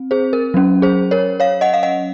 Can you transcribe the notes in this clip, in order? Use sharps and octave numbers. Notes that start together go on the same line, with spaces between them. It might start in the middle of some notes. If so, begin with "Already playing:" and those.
Already playing: C4
G#4 C5
A#4
F#3 C#4
G#4 C5
A#4 C#5
C#5 F5
D#5 F#5
F5
D#5 F#5